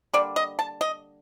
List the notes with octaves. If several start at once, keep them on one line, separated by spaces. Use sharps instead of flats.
D3 G3 A#3 D5
D#5
A5
D#5